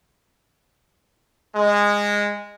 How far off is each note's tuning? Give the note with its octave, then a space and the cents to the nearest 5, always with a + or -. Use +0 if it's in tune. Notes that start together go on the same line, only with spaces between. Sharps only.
G#3 -15